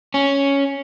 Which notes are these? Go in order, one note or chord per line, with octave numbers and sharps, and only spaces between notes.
C#4